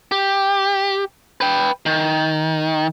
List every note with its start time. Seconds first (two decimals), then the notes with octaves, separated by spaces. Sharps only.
0.12 G4
1.41 B4 G5
1.86 D#3